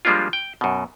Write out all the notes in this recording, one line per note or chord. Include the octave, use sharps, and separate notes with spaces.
F3 G3 G#3 A#3 D4 F4
G5
F#2 B2